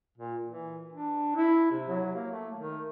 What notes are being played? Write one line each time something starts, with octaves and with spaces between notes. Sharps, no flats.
A#2
E3
D4
E4
C3
F#3
A#3
A3
D#3